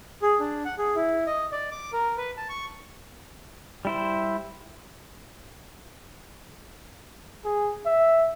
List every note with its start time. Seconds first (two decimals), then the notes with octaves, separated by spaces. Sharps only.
0.22 G#4
0.39 D4
0.65 F#5
0.78 G#4
0.95 E4
1.27 D#5
1.52 D5
1.71 D6
1.93 A#4
2.17 B4
2.37 A5
2.49 C#6
3.85 G3 E4 C5
7.45 G#4
7.86 E5